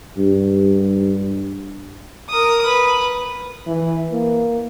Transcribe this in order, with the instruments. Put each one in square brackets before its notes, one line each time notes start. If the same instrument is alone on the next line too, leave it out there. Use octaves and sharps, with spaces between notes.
[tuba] G2
[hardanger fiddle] A#4 D#6
B4
[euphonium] E3
A#3